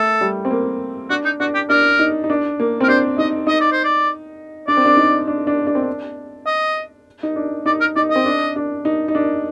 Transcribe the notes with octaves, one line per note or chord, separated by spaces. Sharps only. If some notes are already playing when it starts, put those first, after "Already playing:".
Already playing: A3 A4
G3
C4
A#3
D4 F#4
D#4
D4 F#4
G4
D4 A#4
D#4
D#4
D4
A#3
C4 A#4
D4 C5
D#4 D#5
D#4 D#5
D5
C5
D5
D4 D5
C4
D4
D#4
D4
D4
D4
C4
D4
D#5
D#4
D4
D#4 D5
A#4
D#4 D5
C4 D#5
D4
D4
D#4
D#4
D4